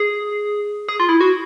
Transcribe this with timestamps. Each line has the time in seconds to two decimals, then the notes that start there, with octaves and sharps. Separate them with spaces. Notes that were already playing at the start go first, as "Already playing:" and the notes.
Already playing: G#4
0.89 G#4
1.00 F4
1.09 E4
1.21 F#4